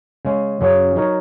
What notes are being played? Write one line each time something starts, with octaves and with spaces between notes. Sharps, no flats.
C#3 G#3 C#4
F#2 C#3 F#3 C#4 G#4
F#3 D#4 A#4 C#5